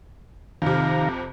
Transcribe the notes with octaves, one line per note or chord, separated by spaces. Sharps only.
F2 C3 D#3 F5 A#5